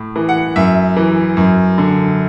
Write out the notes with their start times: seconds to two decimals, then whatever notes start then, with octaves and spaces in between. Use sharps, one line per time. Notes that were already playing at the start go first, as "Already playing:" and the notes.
Already playing: A2
0.16 E3
0.29 F#5
0.56 F#2 E5
0.97 E3
1.37 F#2
1.78 D3